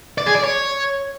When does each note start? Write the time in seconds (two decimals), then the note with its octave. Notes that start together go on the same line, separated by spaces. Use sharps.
0.18 D5
0.26 G#4
0.35 D5
0.44 C#5